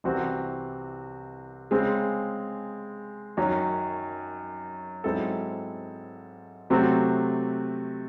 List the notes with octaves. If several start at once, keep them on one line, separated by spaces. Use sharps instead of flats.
C2 C3 E3 C4 F#4
C#3 G#3 C4
F#2 D#3 F#3 C#4
G#2 F#3 C4 E4 A4
C3 F#3 A3 C4 F#4